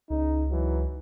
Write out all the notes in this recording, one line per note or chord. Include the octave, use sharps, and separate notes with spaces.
C#2 C#3 D#4
G#2 E3 F#3